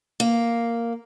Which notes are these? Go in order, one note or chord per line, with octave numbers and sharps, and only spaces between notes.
A#3